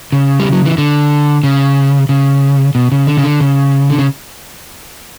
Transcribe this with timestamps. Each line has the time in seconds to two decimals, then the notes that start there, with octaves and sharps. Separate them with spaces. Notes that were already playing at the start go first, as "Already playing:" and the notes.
0.12 C#3
0.40 G3
0.53 F#3
0.65 E3
0.78 D3
1.43 C#3
2.09 C#3
2.75 B2
2.92 C#3
3.07 D3
3.17 C#3
3.24 D3
3.40 C#3
3.90 D3
3.98 C#3